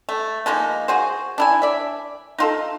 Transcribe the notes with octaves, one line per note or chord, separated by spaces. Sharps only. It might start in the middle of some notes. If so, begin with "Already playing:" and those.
A3
F3 G#3 A#3 D#4
F#4 G#4 C5
D4 E4 G#5
D5 E5
D#4 F4 A4